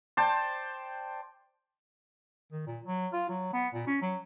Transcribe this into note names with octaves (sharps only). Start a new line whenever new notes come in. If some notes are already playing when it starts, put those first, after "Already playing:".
C5 D5 G5 A5
D#3
A#2
F#3
F4
F#3
B3
A#2
C#4
F#3